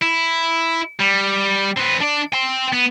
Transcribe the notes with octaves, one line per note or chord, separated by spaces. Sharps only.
E4
G3
C4 B4
D4 D5
G5 C6
B3